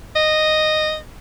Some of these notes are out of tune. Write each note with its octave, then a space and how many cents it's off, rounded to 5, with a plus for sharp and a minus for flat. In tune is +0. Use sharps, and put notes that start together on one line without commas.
D#5 -10